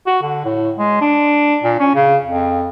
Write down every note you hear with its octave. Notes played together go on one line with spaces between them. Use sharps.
F#4
D3
A2
G#3
D4
A#2
C#4
C#3
F2